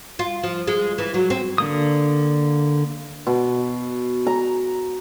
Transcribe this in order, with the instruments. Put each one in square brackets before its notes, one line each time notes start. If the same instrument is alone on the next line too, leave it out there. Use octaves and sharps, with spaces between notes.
[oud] F4
F3
G#3
E3
F#3
C4
[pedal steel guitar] D3 A#3 D#6
[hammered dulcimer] B2
A#5